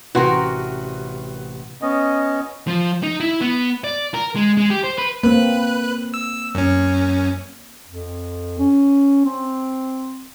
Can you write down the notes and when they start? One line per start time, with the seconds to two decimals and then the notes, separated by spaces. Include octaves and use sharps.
0.15 A1 C3 F#4 A#4 B4 F#5 G5 C6
1.82 B3 C#4 D#5
2.67 F3
3.03 D#4
3.20 E4
3.41 B3
3.84 D5
4.14 A#4
4.36 G#3
4.57 G#3
4.70 G4
4.84 C5
4.98 B4
5.23 A#3 C4 B4 F#6
6.14 E6
6.55 F#2 C#4
7.87 F2
8.59 C#4
9.25 C4